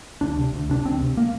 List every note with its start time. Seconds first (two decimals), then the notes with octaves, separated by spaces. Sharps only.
0.21 D2 D4
0.37 C3
0.53 D2
0.69 C3 D4
0.85 D2 C4
1.00 C3
1.17 A#3